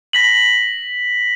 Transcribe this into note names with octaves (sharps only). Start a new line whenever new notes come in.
A#6 B6 F#7